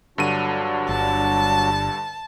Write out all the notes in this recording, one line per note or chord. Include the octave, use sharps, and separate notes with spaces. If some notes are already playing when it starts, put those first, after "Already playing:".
G2 D3 F#3 D4 F#4 D#7
G1 A5